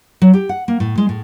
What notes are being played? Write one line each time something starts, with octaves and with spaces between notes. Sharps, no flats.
F#3
G4
F#5
A#3
A2
G#3
A2